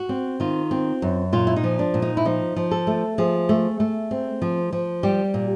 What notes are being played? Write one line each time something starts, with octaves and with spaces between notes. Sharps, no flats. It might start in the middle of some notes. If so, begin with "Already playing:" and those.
Already playing: F#4
C4
D#3 F4
C4
F#2
A#2 F4
E4
D#4
F3
D4
A#2
D#4
E4
F3 D#4
F3
A4
A3
F3 G#4
A3
A3
C4
F3
F3
G3 G4
A#2